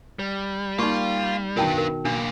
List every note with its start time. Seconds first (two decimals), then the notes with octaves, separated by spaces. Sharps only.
0.19 G3
0.79 A#3 D#4 F5 C6 C#6
1.57 B2 D#3 D4 A#4 B4 G5 A5
1.78 A#4
2.05 B1 A#3 D4